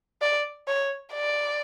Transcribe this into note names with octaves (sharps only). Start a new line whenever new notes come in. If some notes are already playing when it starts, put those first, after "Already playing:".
D5
C#5
D5